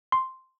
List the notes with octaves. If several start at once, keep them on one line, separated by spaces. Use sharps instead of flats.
C6